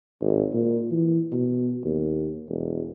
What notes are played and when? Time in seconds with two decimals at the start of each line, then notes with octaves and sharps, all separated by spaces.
0.21 G#1
0.53 A#2
0.91 E3
1.32 B2
1.84 D#2
2.48 E1